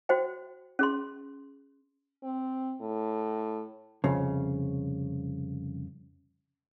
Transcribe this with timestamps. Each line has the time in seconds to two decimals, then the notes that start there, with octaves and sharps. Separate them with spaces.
0.09 F#4 C5 G5
0.79 C#4 G#4 C6
2.23 C4
2.80 A2
4.04 C2 F2 C#3